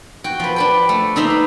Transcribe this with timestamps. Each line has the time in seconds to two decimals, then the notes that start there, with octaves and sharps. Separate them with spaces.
0.24 F#4 G5
0.40 F3 B4
0.56 D4 B4 G5
0.89 A3
1.16 D3 D4 D#4 E5 A#5 C6
1.30 B4